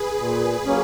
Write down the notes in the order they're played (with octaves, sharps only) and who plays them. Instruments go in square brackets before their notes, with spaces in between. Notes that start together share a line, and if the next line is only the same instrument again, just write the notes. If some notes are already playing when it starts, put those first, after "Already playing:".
Already playing: [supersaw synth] G#4 B4
[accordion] A#2
F#3 A#3 C#4